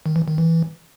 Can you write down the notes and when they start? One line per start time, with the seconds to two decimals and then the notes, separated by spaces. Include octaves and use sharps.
0.06 D#3
0.16 E3
0.28 D#3
0.38 E3